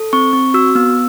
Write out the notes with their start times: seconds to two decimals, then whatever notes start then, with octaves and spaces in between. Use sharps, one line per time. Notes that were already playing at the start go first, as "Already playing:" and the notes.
Already playing: A4
0.13 C4 C#6
0.33 C4 C#6
0.54 F#4 E6
0.75 B3 E6